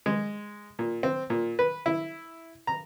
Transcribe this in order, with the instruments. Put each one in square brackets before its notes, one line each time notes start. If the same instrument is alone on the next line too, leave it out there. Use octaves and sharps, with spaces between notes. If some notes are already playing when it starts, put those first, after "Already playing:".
[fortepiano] G#3
A#2
C4
A#2
B4
E4
A#5